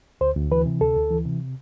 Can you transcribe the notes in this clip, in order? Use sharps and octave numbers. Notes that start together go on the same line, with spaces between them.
D2 C5
D2
E3 B4
C3
D2 A4
D2
E3
C3